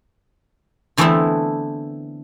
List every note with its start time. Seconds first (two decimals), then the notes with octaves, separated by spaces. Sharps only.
0.97 D3 E3 A3 B3 C4 E4